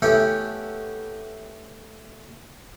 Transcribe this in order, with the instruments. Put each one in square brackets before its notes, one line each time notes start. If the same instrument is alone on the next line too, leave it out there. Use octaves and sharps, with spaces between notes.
[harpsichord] A3 B3 C#4 E4 G4